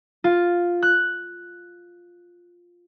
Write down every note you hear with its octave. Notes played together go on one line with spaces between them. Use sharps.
F4
F#6